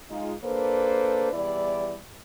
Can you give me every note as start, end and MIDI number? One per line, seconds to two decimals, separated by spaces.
0.11 0.33 56
0.11 0.33 63
0.11 0.33 65
0.44 1.31 58
0.44 1.31 62
0.44 1.31 69
0.44 1.31 71
0.44 1.31 72
1.33 1.97 40
1.33 1.97 55
1.33 1.97 64
1.33 1.97 74